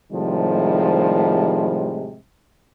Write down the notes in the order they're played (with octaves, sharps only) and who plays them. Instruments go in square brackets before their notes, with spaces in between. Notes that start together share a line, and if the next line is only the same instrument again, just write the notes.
[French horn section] A2 C3 D#3 F3 G3 G#3